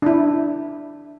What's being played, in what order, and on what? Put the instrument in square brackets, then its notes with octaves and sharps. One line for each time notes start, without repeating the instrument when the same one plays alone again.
[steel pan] D4 E4